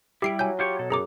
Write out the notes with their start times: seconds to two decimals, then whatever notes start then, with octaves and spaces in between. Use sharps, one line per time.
0.22 G3 E4 G4 C7 D7
0.39 F#3 G#5 G6
0.59 F4 G4 C#5
0.79 B2 A4
0.90 F#2 G#4 A#5 D6